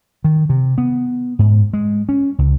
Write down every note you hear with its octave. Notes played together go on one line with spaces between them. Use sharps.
D#3
C3
B3
G#2
G#3
C#4
C#2